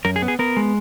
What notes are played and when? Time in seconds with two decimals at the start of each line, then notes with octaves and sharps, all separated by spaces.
0.05 F#2 A#4
0.16 G#4
0.22 B3
0.28 G#4
0.39 B3 A#4
0.57 G#3